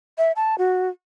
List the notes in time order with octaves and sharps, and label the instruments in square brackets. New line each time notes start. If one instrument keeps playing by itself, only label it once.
[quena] E5
A5
F#4